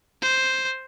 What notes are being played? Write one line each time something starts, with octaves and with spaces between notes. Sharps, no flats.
C5